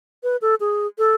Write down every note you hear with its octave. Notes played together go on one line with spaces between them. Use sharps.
B4
A4
G#4
A4